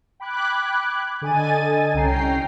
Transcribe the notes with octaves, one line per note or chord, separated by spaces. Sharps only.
G5 B5 D6 F#6 G#6
D3 A4 D#5 G#5 A6 D#7
C2 C#4 G5 A#5 C7